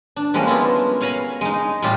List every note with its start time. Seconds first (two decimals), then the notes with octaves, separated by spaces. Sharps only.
0.16 D4
0.34 F3 G3 G#3 A#3 C#4
0.47 B3 E4 F4 A5
1.01 C#5 F5 G#5 A#5 B5
1.41 G#3 D#4
1.82 A2 G3 F4 G4 A5